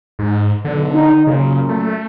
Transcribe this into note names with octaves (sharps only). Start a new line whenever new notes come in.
G#2
B1 D3
D#4
F#2 A#2 C#3
A3